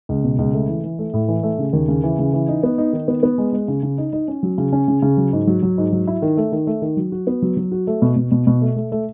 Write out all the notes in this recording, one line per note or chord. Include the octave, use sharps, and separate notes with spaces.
C#2
B2
C#2
A3
E3
E3
A3
A2
E3
A3
C#3
D#2
C#3
E3
C#3
E3
D#4
B3
D#4
D#3
B3
B3
G#3
G#3
C#3
C#3
D#4
D#4
C#4
F#3
C#3
C#4
C#3
C#3
F#3
G#2
F#3
F#3
G#2
F#3
E4
D#3
A3
D#3
A3
D#3
F#3
F#4
B3
F#3
F#3
F#4
A3
B2
B2
B2
B2
A3
A3
A3